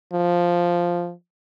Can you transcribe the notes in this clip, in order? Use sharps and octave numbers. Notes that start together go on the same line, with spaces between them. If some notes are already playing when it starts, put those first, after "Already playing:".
F3